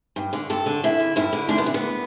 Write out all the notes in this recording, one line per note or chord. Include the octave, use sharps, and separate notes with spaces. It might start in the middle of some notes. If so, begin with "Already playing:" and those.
G2
D3
G2 A4
D3
G2 E4
D3
G2 E4
D3
D2 D4
B3
D3
B3